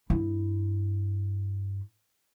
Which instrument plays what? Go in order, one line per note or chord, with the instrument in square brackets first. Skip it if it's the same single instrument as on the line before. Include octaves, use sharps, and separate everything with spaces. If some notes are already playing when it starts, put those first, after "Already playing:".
[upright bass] G2 E4